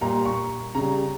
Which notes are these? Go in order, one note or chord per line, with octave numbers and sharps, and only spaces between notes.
A#2 G3 A#5
C#6
C#3 G3 A#5